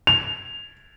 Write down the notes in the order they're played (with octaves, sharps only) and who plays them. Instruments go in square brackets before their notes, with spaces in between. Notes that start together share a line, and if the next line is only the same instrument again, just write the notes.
[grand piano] F7